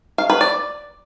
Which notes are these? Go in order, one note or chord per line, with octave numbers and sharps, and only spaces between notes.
F5
B4
D5